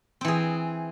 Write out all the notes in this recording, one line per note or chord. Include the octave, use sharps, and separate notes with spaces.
E3 C4 G#4